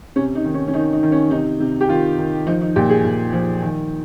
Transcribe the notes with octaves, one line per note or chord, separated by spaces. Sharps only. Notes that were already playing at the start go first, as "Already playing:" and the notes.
C3 C#4
D#4
D#3
C#4
C#4
D#3 D#4
D#4
D#3
C#4
C3 D#4
C3
G4
D#3 F4
D#3
F3 D#4
D#4
A#2 G4
G#4
A#2
F3
D#3